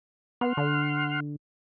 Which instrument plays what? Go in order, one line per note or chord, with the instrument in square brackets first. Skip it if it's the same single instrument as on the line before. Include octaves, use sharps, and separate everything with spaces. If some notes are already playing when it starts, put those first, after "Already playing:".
[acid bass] B3 [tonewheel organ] F#5 C6 F6
[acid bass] D3